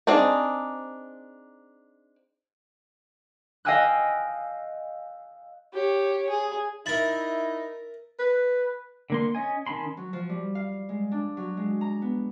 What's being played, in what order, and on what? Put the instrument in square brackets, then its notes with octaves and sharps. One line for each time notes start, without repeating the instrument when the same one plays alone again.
[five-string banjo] C4 D4 D#4 G#4
[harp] D#5 F5 G5 G#5 E6 F#6
[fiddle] G4 C#5
G#4
[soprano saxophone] D#4 [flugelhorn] E4 [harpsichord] A#4 E5 [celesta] A6 F#7
[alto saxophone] B4
[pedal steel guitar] D3 A#3 C6
C#4 D#5 G#5
D#3 C#4 A5 B5 C6
[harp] F#3
F3
G3
F5
G#3
D4
F#3
G#3
A#5
B3